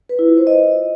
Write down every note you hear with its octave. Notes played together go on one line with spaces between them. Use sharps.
B4
E4
F4
C5
D#5